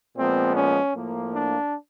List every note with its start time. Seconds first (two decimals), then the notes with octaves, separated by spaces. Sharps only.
0.16 A#2 F3 G#3 B3 C4
0.56 C#4
0.94 A2 F3 A#3
1.33 D4